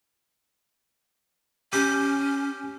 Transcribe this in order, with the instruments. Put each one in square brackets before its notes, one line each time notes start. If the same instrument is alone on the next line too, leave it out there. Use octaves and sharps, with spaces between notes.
[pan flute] C#4 [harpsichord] G4